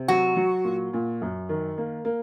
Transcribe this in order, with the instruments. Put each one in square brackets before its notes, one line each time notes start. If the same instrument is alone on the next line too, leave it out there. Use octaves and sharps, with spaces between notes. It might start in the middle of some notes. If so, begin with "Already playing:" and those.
Already playing: [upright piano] C3
[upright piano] F#3 [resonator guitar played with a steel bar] F#4
[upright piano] F#3
A#2
A#2
F#2
D#3
A#3
A#3